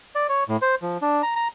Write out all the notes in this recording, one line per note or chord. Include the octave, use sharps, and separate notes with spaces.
D5
C#5
A2
C5
F3
D4
A#5
A#5